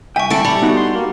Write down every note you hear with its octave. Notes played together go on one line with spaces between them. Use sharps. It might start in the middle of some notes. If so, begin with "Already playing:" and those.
C2 E5 G5 G#5 C#6
D3 E4 A4 C#6 D7
G3 G4 B5
B3 D#4 F#4
C6
A#3